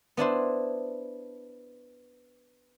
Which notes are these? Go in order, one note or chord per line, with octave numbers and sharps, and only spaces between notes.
B3 D4 E4 C5